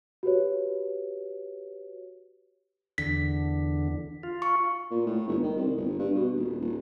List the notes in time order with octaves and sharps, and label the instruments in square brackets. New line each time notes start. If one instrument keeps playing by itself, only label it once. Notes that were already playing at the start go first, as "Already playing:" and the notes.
[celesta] F#4 G4 B4 C#5
[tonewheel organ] E2 D3 [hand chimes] B6
[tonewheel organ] F4
[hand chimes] C#6
[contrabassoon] A#2
A2
G1
D#3
C2
G1
G2
B2
D#1
D#1